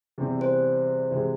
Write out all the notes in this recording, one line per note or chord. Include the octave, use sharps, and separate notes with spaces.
E2 C3 E3 G3 C4
C5
C3 E3 G#3 C4